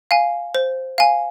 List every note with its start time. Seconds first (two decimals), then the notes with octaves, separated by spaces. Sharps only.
0.11 F5 G#5
0.55 C5
0.98 F5 G#5